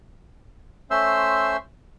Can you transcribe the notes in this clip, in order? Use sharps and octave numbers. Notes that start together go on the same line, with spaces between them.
A3 C#4 C5 E5 C6 E6